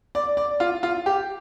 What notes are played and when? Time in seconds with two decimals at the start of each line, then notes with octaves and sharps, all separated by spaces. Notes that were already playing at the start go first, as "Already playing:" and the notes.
0.15 D5
0.37 D5
0.60 F4
0.83 F4
1.06 G4